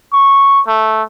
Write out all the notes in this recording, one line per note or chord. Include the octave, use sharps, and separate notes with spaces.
C#6
A3